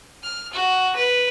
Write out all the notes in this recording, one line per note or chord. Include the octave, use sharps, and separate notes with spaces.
F6
F#4
B4